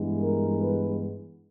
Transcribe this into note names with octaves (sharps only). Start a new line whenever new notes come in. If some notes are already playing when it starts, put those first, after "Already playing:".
Already playing: G2 E3 G#3 B3
A#4
B4